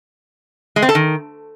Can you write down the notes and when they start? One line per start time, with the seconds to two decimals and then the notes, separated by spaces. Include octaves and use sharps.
0.76 G#3
0.82 C4
0.89 A4
0.95 D#3